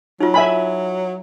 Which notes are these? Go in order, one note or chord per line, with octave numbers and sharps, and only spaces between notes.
F#3 D#4 F4
E5 G#5 B5